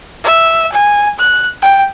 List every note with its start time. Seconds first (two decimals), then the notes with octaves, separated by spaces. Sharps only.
0.24 E5
0.72 G#5
1.19 F#6
1.62 G5